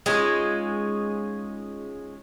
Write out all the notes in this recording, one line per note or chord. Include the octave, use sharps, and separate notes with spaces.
G#3 C#4 D#4 F4